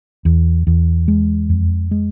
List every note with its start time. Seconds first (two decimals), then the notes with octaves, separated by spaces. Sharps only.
0.25 E2
0.67 E2
1.08 G#3
1.49 F2
1.91 G#3